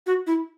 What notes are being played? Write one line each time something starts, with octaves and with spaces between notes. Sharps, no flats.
F#4
E4